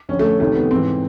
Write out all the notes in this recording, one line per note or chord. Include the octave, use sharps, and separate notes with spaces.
F2 D3 C#4
A3
F2 C3 D#3 A3
B3
G#2 E3 C4